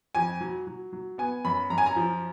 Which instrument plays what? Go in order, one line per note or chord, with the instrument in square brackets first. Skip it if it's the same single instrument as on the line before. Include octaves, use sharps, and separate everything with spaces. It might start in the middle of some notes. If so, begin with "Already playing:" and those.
[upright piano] F2 G#5
F#3
F#3
F#3
B3 G#5
F#2 B5
F#2 A#5
G#5
A#5
F3